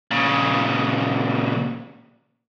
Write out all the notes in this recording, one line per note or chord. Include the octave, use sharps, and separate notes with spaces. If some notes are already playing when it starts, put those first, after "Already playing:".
A#2 C#3